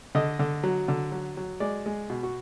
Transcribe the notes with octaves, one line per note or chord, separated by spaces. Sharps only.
D3 D#5
D3
F#3
D3
F#3
F#3
G#3 D5
G#3
B2
F#4